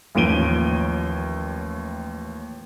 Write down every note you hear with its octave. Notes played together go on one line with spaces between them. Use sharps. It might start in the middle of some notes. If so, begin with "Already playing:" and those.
A1 D#2 F3 D7 D#7 G7